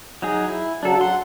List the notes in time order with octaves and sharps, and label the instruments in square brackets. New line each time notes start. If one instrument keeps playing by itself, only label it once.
[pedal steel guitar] F#3 D#4 G#4
E4
[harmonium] C#3 F#3 [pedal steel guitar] D4 A4
[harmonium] F#5 [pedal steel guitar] C6